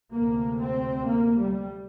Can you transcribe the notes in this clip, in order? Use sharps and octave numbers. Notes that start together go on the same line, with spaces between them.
D2 C3 A#3
C4
A#3
G3